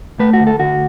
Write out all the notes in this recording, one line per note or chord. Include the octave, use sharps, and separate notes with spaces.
A3 B4
F#4
D2
A4
D2 F#4